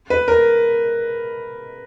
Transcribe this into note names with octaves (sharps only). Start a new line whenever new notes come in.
B4
A#4